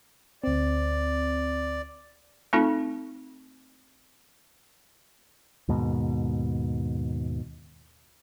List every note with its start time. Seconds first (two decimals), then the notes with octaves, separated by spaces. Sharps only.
0.44 D2 C4 D5
2.53 A3 C4 D#4 F4 A4
5.68 D#2 G#2 B2